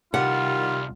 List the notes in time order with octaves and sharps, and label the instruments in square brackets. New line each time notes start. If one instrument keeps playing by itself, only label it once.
[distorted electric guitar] C2 [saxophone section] D#3 G3 [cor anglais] F4 [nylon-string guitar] F#5